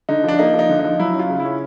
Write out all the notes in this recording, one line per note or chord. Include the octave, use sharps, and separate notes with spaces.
D3 D#4
F3 D4
A#3 D#4
F3
D#4
D3
D#4
F3
F#3 E4
C#4
F4
C#3
E4
C#4